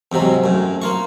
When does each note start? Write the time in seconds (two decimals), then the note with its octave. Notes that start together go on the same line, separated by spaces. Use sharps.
0.12 F2 G#2 C3 F#3
0.44 F#2 A2
0.82 A#3 F4 C#6